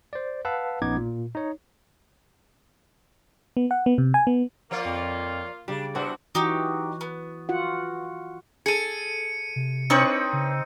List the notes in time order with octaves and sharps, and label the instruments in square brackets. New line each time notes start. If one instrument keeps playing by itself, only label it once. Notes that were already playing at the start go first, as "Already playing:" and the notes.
[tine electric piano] C5 D5
B4 F5 F#5 A5 E6
A#1 B3 C#4 D#4 D6 G#6
A#2
D#4 C#5
[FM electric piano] B3
F#5
B3
C3
G#5
B3
[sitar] F3 C#5 D5 [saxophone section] A#3 F4 [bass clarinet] A#4
[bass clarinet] F2
[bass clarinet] C#3 [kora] G3 [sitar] D4
[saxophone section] E2 [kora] C4 D4 [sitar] F#4
[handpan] E3 F#4 [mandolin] D#4 G4
[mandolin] B3
[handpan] F4 F#4 F#5
[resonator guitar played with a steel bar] G#4 A4 [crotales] C#7 D#7
[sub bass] C3
[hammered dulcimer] C4 D#4 [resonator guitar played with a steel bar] D4 B4 C#5
[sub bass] C#3